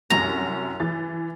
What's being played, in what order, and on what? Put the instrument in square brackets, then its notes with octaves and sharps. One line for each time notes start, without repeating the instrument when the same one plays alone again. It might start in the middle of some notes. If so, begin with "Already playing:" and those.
[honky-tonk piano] C2 F#2 F#4 [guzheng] A#5
[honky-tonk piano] E3 A6